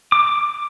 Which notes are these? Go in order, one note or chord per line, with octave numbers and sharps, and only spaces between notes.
D6